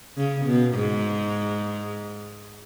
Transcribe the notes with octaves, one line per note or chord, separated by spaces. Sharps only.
C#3
B2
G#2